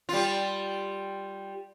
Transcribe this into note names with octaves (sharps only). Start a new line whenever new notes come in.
G3 F4